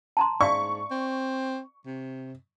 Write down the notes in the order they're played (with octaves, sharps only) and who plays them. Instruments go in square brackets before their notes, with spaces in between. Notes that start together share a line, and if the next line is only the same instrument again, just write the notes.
[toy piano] A5 A#5 C6
[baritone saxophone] G#2 [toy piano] D5 E5 F5 [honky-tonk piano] C#6
[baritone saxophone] C4
C3